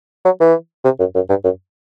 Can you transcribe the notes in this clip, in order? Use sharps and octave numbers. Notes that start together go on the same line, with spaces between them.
F#3
E3
C3
F#2
F#2
G2
F#2